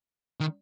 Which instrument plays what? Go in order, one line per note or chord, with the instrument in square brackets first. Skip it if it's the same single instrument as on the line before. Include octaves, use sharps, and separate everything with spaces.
[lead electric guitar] D#3